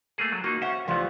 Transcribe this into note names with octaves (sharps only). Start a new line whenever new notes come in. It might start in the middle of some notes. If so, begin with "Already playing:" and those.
A3 A#3 G#4
F#3
A#3 D#4 F#4
C#4 C5 E5 F#5
C2 F3 G3 A3 B3